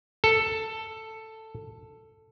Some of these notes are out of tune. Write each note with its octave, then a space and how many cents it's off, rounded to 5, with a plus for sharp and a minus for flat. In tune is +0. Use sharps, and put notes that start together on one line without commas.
A4 +10